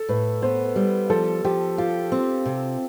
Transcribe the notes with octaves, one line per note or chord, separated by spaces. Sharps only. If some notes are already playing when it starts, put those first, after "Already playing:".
Already playing: A4
A2 B4
B3 C5
G3
F3 A4
F3 G4
F4 G4
C4
C3